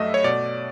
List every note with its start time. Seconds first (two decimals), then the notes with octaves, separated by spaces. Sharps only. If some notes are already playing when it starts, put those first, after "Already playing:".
Already playing: G2 F#3 A3 D#5 E5
0.14 C#5
0.24 B2 D5